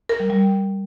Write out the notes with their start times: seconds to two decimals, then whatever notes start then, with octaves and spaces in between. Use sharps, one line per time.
0.09 A#4
0.20 G3
0.30 G3